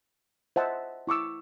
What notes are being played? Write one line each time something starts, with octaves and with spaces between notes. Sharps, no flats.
C5 D#5 E5 F#5 A5
E4 C#6 D6 E6